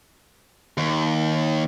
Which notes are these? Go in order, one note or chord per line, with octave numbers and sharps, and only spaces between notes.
D#2